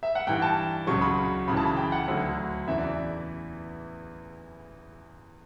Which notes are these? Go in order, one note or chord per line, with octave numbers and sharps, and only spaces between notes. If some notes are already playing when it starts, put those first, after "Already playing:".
E5
F#5
G2 E3 G5
A5
C#2 C#3 F#3 C#6
B5
C#2 C#3 E3 B5
A5
B5
G5
F#5
D2 D3 F#3
E2 C#3 E3 E5
D5